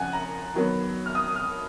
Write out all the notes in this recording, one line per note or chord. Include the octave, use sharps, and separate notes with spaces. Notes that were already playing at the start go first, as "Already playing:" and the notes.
Already playing: C#3 F3 F#5 G#5 F#6 G#6
A#5
D#3 F#3 B3
F6
D#6
F6